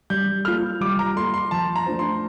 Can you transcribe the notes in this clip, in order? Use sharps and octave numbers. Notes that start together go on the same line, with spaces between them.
G3 G6
A#3 F4 A4 F6
G3 D6
A#5
A#3 F4 A4 C6
C6
F3 A5
A#5
A3 D4 F4 C5
C6